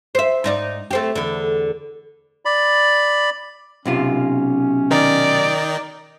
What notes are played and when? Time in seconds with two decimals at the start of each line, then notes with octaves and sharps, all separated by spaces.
0.15 C5 E5
0.44 G#2 D#4 D5
0.91 A3 C4 G4
1.15 E2 D3
2.45 D5 B5
3.85 B1 C3 C#4 F4
4.91 D#3 D#4 D5